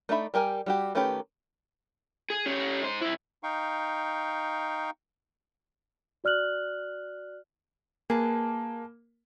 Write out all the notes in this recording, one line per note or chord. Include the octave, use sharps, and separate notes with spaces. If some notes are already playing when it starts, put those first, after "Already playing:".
A3 D4 D#4 E5 B5
G3 G4 A#4 G#5
G3 F#4 G4
D#3 A3 C#4 G4 B4
G#4
C#4 G4
G#2 C5
C2 E4
D#4 F5 G5 C#6
F#4 D5 F6 F#6 F#7
A#3 G#4 B4 A5